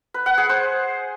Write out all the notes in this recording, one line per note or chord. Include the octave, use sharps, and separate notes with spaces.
B4
F#5
G#4
C5